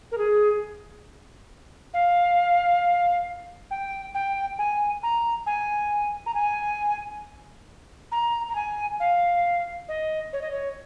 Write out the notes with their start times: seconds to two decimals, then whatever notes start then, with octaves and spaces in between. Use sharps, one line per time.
0.11 A#4
0.18 G#4
1.94 F5
3.71 G5
4.14 G5
4.58 G#5
5.03 A#5
5.46 G#5
6.26 A#5
6.34 G#5
8.12 A#5
8.49 A#5
8.55 G#5
9.00 F5
9.88 D#5
10.33 C#5
10.41 D#5
10.51 C#5